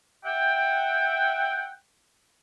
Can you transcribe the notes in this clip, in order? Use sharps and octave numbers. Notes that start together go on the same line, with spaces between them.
E5 F#5 G5